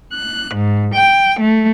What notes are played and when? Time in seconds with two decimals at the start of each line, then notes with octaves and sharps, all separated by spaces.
0.13 F#6
0.55 G#2
0.94 G5
1.39 A3